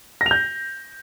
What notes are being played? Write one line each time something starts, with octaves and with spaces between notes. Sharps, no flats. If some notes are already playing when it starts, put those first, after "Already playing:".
A#6
F7
G6